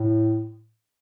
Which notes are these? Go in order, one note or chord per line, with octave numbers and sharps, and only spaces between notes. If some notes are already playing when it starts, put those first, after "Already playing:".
Already playing: A2